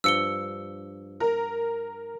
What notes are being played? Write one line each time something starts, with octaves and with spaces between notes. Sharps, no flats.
G2 F3 E6 C#7 G7
A#4